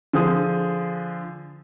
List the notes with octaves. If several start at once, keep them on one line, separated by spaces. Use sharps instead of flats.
D3 F3 G#4 D#6